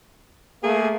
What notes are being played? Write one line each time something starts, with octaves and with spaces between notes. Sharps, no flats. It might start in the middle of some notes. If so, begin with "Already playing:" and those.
A3 A#3 G#4